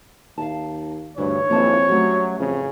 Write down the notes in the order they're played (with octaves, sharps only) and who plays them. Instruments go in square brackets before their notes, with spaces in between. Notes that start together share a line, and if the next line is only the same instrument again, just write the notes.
[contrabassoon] D#2 [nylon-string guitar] F5 A5
[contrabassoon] D2 [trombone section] G2 [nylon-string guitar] E3 [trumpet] C#5
[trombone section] G#1 E3 [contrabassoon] F2 [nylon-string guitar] A#3 E5 A5
[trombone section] F#3 [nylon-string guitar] G3 A3 C#4
[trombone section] A1 C#3 [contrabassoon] F2